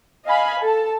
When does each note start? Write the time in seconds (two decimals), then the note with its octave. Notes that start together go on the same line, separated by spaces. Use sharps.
0.24 D#5 F5 G#5 B5
0.60 A4 A5